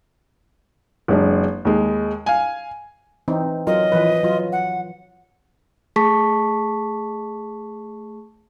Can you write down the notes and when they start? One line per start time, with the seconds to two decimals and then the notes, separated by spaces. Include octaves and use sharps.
1.08 F#1 G#3 D4
1.65 D#2 G#3
2.26 F5 G#5
3.28 E3 C4 D#4
3.67 F#3 F4 A#4 D#5
3.92 E3 F3 B4
4.23 F#3 F4
4.52 F#5
5.96 A3 G#4 A5 C#6 B6